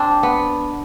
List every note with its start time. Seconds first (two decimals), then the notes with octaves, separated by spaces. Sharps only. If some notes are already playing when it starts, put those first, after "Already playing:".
Already playing: C4 D4
0.23 B3